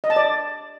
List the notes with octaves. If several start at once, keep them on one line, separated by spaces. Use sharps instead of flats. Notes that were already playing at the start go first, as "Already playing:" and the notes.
D#5
A5
D5